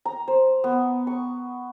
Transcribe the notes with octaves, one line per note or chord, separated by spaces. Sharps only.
A#5
C5
B3
C#6